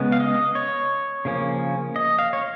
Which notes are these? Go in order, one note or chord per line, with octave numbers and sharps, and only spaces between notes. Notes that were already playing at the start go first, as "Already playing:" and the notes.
Already playing: C#3 G#3 B3
F5
D#5
C#5
C#3 F3 A#3 C#4
D#5
F5
C#5